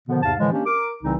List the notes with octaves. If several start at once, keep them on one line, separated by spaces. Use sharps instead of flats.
B2 D3 D#3 F3 B3
E2 G#2 C3 F5 A5
A2 D3 E3 F3 G#3
A#3 C#4 D4 G4
A#4 D6
C2 C#3 E3 C4 D#4